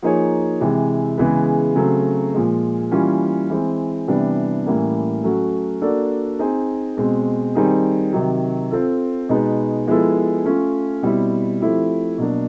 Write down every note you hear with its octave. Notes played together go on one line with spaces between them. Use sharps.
F3 A#3 D#4 G#4 C#5
C3 E3 G#3
C#3 E3 G#3 B3
C#3 F#3 A3 C4
A#2 F3 G#3
E3 G3 A#3 C#4 F4
E3 G#3 C4
C3 E3 G3 B3 D4
A2 E3 G3 A#3 C#4
F#3 A3 C#4 F#4
A#3 D4 F#4 A4 D5
C4 D#4 G#4
B2 G#3 C4
D#3 G3 C4 D#4 G#4
C3 D#3 F#3
C4 F4 A4
B2 G#3 B3 D#4
F3 G#3 B3 E4 A4
A3 C#4 F4
B2 G3 C4 E4
F3 A3 C4 E4 G4
B2 F#3 A#3 D4